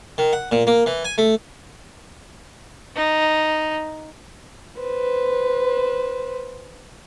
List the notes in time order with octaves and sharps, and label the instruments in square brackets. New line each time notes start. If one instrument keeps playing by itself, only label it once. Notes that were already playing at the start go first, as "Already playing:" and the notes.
[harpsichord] D#3
F#5
A#2
A#3
E3
G#5
A3
[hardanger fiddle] D#4
[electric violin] B4 C5